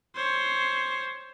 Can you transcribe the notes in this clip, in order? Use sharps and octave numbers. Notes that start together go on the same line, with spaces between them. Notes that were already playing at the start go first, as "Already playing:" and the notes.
C5 C#5